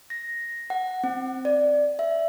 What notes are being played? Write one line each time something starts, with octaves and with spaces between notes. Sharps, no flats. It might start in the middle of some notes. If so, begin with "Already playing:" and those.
A#6
F#5
C4
D5
E5